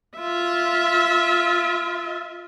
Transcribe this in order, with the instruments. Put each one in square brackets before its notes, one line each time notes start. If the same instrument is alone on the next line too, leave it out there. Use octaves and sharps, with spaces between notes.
[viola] F4 E5